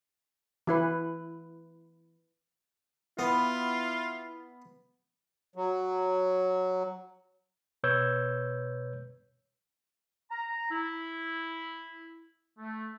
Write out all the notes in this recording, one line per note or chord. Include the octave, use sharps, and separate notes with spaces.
E3 E4 B4
B3 E4 F4
F#3
B2 B4 C#5 E6 G6 G#6
A#5
E4
A3